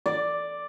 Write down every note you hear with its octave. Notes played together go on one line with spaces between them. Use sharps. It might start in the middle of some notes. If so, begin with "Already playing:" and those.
D5